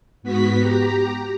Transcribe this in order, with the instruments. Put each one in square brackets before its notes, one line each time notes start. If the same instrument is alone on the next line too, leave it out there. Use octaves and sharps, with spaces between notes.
[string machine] G#2 B3 F#4 B6
G4 A#5